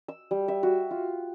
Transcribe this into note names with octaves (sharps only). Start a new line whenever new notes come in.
E6
G3
E5
F#4
F4